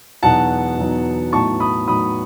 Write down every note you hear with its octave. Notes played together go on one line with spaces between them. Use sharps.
E2 B2 F#3 B3 D#4 F#5 A5
E2 B2 F#3 B3 D#4
A2 F#3 B3 D#4 A5 C#6
B5 D#6
A2 F#3 B3 D#4 B5 D#6